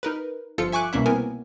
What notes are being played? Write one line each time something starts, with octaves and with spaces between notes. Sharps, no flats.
D#4 A#4 B4
G1 F3 F4 A4 C#7
E5 G#5 C#6 D6 F#6
C2 B2 A#3 C#4 E4 E5
B3 C4 A#4 G#5